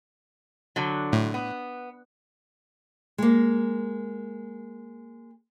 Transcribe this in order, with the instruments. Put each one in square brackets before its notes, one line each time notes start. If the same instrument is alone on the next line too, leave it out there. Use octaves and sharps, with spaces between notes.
[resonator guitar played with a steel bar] D3 F#3
[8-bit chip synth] A2
[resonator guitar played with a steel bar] B3
[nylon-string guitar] G#3 A#3